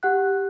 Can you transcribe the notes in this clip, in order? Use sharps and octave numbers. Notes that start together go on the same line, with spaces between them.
G4 F#5 F#6